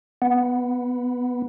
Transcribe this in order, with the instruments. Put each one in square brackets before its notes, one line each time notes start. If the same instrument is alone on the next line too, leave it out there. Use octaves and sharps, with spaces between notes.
[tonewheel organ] B3